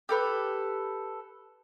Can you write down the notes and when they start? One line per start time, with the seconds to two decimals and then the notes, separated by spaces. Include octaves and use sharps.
0.09 G4 A4 B4